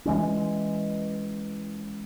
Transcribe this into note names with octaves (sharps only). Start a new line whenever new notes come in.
E3 G#3 C#4